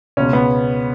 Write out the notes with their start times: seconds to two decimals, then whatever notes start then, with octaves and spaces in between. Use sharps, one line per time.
0.17 C#2 B2 C#4
0.33 B3